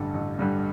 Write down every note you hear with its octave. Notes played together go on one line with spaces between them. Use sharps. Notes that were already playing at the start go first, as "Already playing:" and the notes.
Already playing: A1 G2 D3 G3 A4
A1
G2 D3 G3